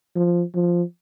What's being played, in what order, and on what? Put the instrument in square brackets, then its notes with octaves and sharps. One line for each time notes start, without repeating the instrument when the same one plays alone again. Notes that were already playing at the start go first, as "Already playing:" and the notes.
[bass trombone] F3
F3